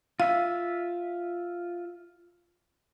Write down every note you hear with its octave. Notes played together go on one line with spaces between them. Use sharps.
F4 E5 F5